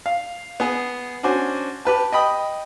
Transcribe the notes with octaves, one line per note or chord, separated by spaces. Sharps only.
F5
B3 G#4
C#4 D4 F#4 C5 G#5
G4 B4 A5
D#5 G5 B5 D#6